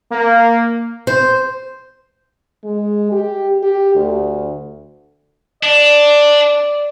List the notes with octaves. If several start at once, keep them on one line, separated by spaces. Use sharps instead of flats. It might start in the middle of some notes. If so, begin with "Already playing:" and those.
A#3
C5
G#3
G4
G4
D2
D4 D5